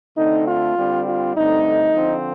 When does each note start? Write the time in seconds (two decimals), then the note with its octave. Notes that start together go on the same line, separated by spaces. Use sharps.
0.17 D3 A3 C4 D#4
0.46 F4
0.76 D3 G3 C4
1.06 F4
1.34 G2 D3 A3 C4 D#4
1.93 D3 F3 C4